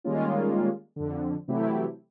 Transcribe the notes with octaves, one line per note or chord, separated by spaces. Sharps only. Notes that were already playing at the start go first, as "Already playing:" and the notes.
D#3 G3 G#3 A#3 C#4 F4
F2 D3
C3 E3 F#3 A3 E4 G4